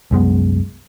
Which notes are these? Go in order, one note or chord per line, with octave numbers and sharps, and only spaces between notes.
C2 F#2 G#3 B3